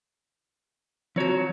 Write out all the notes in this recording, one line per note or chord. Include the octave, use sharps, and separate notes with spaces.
F3 C4 F#4 C#5